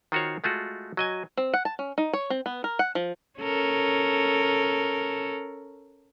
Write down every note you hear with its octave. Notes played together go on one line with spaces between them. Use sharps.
D#3 F4 F#4 C5 C#5
G#3 A3 F4 F#4
F#3 D#5 G#5
C4
F#5
A5
C#4
D#4
C#5
C4
B3
A#4
F#5
F3
C#4 A4 A#4